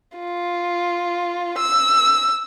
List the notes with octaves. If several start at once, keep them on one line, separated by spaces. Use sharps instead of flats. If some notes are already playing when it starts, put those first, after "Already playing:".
F4
E6